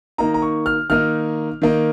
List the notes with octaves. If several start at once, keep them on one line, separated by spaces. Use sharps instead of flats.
D#3 A#3 D#4 A#5
A#5
C#6
F6
D#3 A#3 D#4 F6
D#3 A#3 D#4